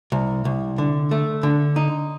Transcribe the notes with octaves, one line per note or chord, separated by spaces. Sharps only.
C2
C2
D3
A3
D3
D#4